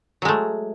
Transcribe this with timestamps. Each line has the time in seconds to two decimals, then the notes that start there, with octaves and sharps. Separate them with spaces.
0.22 F#3
0.25 G#3
0.28 A3